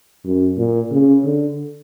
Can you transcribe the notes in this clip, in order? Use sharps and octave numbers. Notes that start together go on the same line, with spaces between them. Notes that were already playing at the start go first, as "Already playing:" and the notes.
F#2
A#2
C#3
D3